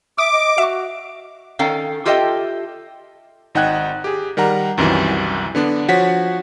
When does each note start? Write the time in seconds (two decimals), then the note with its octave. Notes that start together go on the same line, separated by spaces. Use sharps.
0.18 E5 D6 D#6
0.32 D#5
0.58 F#4 E5 C#6
1.59 D#3 C#4 A4 F5 G5
2.05 F4 G4 A4 D#5 E5 G5
3.55 G#1 D#4 F#5 G5 F#6 G#6
4.04 G4 G#4
4.37 D#3 G3 A#4 F#5 A#5
4.78 C2 F#2 C3 D#3 E3
5.55 D3 B3 D4
5.88 F3 F#4 C#5 F#5 B6